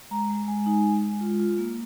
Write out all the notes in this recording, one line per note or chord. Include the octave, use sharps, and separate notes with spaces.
G#3 A#5
G#3
G#3 G#5
D#4
G#3
G#3
F4
F4
A#3